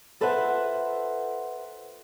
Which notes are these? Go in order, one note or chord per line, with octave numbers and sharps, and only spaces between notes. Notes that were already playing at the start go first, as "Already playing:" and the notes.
F4 A4 B4 C5 E5 F#5